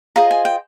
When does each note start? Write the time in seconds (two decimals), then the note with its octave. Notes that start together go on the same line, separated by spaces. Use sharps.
0.16 F4 G#4 C5 D#5 A#5
0.31 G#5
0.45 G5